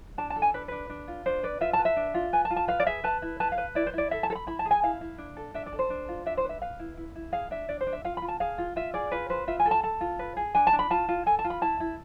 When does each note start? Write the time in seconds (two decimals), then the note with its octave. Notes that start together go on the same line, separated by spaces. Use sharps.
0.18 D4 A5
0.30 A5
0.36 A4
0.42 G#5
0.54 D4 B4
0.68 D4 B4
0.89 D4
1.08 F4
1.26 D4 C5
1.43 B4 D5
1.61 F4 E5
1.73 A5
1.79 B4
1.85 E5
1.96 D4
2.14 F4
2.33 B4 G#5
2.45 A5
2.50 F4
2.56 A5
2.68 B4 F5
2.80 D5
2.87 G#4 E5
3.04 B4 A5
3.22 E4
3.40 B4 A5
3.52 F5
3.58 B4
3.75 E4 D5
3.87 C5
3.94 E4 D5
4.11 A4 E5
4.23 A5
4.30 A4
4.35 B5
4.47 E4 B5
4.59 A5
4.65 G#4
4.71 G#5
4.83 E4 F5
5.01 E4
5.18 D4
5.37 A4
5.54 D4 E5
5.66 D5
5.73 A4
5.79 C5
5.90 D4
6.09 F4
6.26 D4 E5
6.37 C5
6.44 B4
6.49 E5
6.62 B4 F5
6.79 E4
6.97 E4
7.15 E4
7.32 G#4 F5
7.51 D4 E5
7.69 D4 D5
7.81 C5
7.87 D4
7.93 E5
8.04 F4 F5
8.17 F4 B5
8.28 A5
8.40 G#4 F5
8.58 F4
8.76 F4 E5
8.94 G#4 D5
9.12 F4 B4
9.30 B4 C5
9.47 F4 E5
9.60 G#5
9.65 A4
9.71 A5
9.83 A4 A5
10.01 F4
10.19 B4
10.37 G#4
10.55 D4 G#5
10.67 A5
10.73 D4
10.79 B5
10.90 F4 A5
11.09 F4
11.26 A4 G#5
11.39 A5
11.44 F4
11.50 B5
11.62 E4 A5
11.80 E4